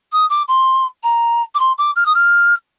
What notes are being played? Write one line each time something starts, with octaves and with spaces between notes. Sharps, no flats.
D#6
D6
C6
A#5
D6
C6
D6
F6
D#6
F6